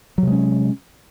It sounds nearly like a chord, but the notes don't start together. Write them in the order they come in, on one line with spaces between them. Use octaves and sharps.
F#3 C3 G#3 C#4